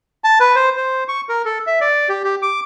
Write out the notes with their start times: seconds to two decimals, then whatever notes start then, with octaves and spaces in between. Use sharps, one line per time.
0.24 A5
0.40 B4
0.56 C5
0.77 C5
1.08 C#6
1.29 A#4
1.45 A4
1.67 E5
1.81 D5
2.09 G4
2.24 G4
2.42 D6